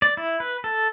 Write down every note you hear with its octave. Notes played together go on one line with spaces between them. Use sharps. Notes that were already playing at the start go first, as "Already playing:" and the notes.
D5
E4
B4
A4